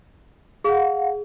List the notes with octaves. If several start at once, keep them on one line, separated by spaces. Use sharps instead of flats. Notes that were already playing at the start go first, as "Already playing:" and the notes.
G#4 F5 F#5